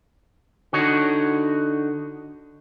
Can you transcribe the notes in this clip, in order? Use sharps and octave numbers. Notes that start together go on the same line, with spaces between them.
D3 D#4 F#4 C#5